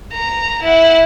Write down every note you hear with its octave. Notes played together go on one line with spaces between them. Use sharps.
A#5
E4 F#5